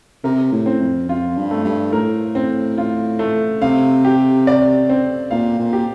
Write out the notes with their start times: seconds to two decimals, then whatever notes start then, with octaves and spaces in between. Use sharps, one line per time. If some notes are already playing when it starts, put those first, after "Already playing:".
0.24 C3 A#4
0.52 A2
0.66 C4
0.81 F2
1.08 F2 F4
1.37 G2
1.51 A3
1.65 G2
1.93 A2 A#4
2.35 C4
2.78 F4
3.19 A3
3.62 C3 F5
4.05 G4
4.47 D5
4.89 C4
5.31 A#2 F5
5.59 A#2
5.73 G4